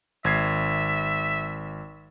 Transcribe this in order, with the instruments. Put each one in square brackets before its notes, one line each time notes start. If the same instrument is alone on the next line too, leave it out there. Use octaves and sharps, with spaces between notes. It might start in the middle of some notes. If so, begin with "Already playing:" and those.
[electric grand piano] G#1 G#6 C7 [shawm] E5